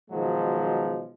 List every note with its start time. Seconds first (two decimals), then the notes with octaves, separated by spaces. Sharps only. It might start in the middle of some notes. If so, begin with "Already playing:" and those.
0.11 B2 D#3 F3 F#3 G#3